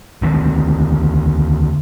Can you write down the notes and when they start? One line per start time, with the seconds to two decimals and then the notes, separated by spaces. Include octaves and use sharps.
0.22 D2 D#3 A3 C4